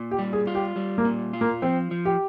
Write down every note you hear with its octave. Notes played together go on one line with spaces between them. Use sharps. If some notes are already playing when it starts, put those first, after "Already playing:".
Already playing: A#2
G4
G3
G#4
F4
G4
G3
A#3
A#2
F4
A#3
F3 C4
F3
G4